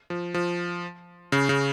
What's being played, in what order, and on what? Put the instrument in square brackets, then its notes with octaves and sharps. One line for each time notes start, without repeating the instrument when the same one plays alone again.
[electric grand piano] F3
F3
C#3
C#3